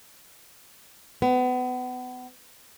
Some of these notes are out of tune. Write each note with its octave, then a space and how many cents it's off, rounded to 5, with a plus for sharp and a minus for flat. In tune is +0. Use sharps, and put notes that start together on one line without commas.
B3 +30